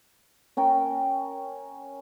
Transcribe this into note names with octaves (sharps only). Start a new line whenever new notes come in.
C#4 A#4 G5